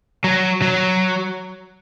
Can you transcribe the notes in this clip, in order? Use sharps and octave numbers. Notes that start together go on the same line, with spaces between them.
F#3
F#3